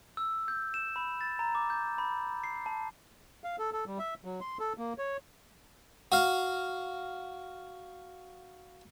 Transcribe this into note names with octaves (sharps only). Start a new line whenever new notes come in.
E6
G6
E7
B5
A6
A#5
D6
G6
B5
C7
A5
F5
A4
A4
G3
E5
F#3
C6
A4
A#3
C#5
F#4 F5